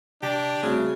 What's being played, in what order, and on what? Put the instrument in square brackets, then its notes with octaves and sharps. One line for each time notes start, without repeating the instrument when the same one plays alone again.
[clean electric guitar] C3 A5 [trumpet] D4 [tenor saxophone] G4
[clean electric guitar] C2 A3 [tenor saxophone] C#3 [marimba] C4 F#4 E5